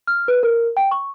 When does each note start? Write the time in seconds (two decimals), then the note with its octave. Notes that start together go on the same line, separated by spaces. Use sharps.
0.07 F6
0.28 B4
0.43 A#4
0.77 G5
0.91 C#6